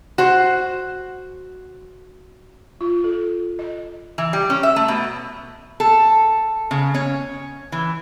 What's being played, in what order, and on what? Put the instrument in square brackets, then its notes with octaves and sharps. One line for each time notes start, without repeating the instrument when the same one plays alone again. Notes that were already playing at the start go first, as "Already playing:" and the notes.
[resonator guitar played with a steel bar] F#4 C5
[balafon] F4
A4
D#5
[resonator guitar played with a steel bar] E3
G3
C#4
E5
A3
B2
A4
C#3
C#4
E3